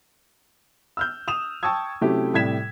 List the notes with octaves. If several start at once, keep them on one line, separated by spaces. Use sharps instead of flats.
E6 F6 G6
D#6 E7 F7
G5 A5 C#6 D#6 E6 G#6
C3 F#3 A3 C#4 E4 G4
A2 C3 G3 G#6 B6 E7